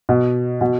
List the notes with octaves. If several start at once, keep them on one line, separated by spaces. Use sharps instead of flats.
B2
B2